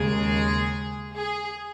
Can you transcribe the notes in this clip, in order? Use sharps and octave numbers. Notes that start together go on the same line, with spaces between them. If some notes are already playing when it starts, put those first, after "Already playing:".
Already playing: D#2 C#3 G#3 G#4
G#4